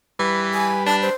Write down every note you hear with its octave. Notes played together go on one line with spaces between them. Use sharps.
E3 G3 B4
G#5
D4 A5
C5